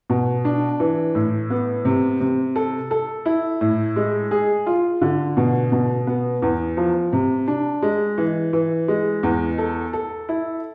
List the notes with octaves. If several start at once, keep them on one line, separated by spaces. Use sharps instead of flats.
B2
D4
E3
A2
B3
C3
C3
A4
A4
E4
A2
G#3
G#4
F4
D3
B2
B2
B3
E2
F3
C3
D4
G#3
E3
E3
G#3
E2
A4
A4
E4